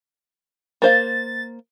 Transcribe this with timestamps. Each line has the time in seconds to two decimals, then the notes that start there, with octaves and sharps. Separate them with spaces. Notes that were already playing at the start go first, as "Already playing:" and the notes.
0.82 A#3 C5 F5 A6